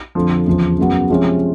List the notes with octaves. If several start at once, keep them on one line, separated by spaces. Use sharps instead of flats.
F2 D3 F3
E2 C#3 F3
F#2 C#3 F#3 B3
C3 F3 G#3 C#4